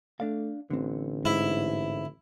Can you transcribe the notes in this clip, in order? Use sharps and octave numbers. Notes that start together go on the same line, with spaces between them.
A3 D4 D5 F5
A1 D3 C4
G#2 E4